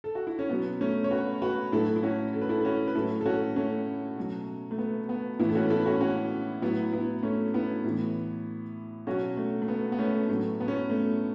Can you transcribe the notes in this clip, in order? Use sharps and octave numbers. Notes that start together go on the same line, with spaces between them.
A4
F#4
E4
C#4
B2 F#3 B3
A3 C#4
C#5
F#4 B4
F#4 B4
A2 F#3 E4 A4
E4
C#4 F#4
A4
B4
E4 A4
A4
C#4 F#4
B4
A2 F#3 E4 A4
A4
C#4 F#4
A3 C#4
B2 F#3
A3
B3
B3
A2 E3 B3 E4
A4
C#4 F#4
B4
E4 A4
C#4 F#4
C#4 F#4
A2 F#3 B3 E4
B3 E4
A3 C#4
B3 E4
A2 E3
B2 F#3 C#4 F#4
A3
A3
B3
B3
A3 C#4
A2 F#3 A3
B3
C#4
B3
A3